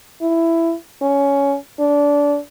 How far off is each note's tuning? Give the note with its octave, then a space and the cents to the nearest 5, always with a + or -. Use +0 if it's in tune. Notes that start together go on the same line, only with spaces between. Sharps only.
E4 +10
C#4 +15
D4 -20